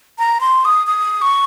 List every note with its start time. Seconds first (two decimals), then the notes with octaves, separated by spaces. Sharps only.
0.18 A#5
0.41 C6
0.65 D#6
0.87 D#6
1.22 C#6